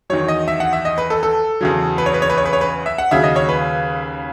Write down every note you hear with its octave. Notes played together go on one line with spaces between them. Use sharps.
E2 D#3 F#3 C#5
D#5
E5
F#5
E5
D#5
B4
A4
A4
E2 C#3 F#3
B4
C#5
B4
C#5
B4
C#5
B4
C#5
B4
E5
F#5
D#2 C#3 F#3 E5
D#5
C#5
B4